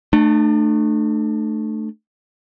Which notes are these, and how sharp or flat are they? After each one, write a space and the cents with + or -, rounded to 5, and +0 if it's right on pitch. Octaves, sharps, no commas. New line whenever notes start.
A3 +0 D4 +40